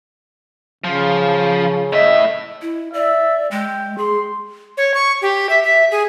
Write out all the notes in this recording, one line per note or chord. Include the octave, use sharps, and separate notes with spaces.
C#3 F3
A2 D#5 E5
E4
D5 E5
G#3 G5
G#4 C6
C#5
C#6
G4
E5
E5
G#4